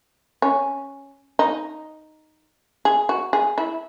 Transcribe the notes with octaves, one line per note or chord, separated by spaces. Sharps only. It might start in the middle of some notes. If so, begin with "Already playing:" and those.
C#4
D#4
G#4
F#4
G#4
E4